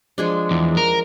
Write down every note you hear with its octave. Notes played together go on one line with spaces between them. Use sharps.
F3 G#3 D4
E2
A#4